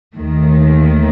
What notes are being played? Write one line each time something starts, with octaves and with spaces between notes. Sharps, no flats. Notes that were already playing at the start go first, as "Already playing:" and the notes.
D#2 D#3 A3